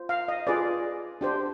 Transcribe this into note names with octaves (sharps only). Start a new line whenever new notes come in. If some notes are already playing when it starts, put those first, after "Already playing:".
Already playing: F4 C5
F5
D#5
F4 G#4 B4 D5
D4 G4 C5